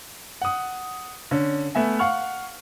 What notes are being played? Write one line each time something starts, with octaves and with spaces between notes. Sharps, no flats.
F#5 D#6
D3 C#4
A3 B3 E5 G#5
F5 F#5 C#6 F6